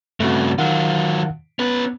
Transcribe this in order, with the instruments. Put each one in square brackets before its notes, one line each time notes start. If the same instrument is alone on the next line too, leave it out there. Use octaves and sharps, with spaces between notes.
[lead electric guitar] G2 C#3 [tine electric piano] A3 C4 F#4
[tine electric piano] D#3 F5 F#5 [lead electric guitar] F#3 F4
[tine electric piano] B3 [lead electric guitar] C#4 B4